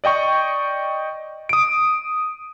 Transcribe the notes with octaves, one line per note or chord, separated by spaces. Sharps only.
D5 D#5 G5 C#6
D#6 D7